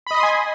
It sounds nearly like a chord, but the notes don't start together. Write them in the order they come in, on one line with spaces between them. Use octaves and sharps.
B5 D#5 D#6 C6 G#5